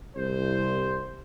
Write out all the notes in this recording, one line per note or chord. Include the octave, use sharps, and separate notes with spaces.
C2 C5